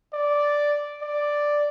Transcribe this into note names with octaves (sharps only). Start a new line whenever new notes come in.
D5
D5